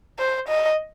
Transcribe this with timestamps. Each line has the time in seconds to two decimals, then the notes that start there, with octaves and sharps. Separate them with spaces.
0.19 C5
0.48 D#5